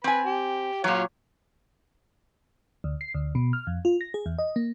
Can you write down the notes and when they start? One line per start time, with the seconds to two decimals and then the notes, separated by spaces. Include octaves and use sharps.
0.04 C4 B4 G#5 B5
0.25 G4
0.84 A#2 F#3 F4 C#5 F5
2.84 D2
3.01 C7
3.14 D2
3.35 B2
3.53 F6
3.67 F2
3.85 F4
4.01 A#6
4.14 G#4
4.26 E2
4.39 D#5
4.56 A#3